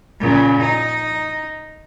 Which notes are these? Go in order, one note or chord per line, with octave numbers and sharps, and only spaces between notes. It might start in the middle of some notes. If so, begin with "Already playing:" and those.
A#2 C#3
D#4